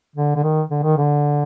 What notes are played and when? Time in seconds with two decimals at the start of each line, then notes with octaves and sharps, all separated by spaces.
0.16 D3
0.36 D3
0.43 D#3
0.70 D3
0.83 D#3
0.97 D3